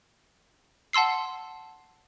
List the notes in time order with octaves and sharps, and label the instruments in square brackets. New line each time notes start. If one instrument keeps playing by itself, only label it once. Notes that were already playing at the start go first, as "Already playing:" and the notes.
[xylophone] F#5 A5 C6 E6 C7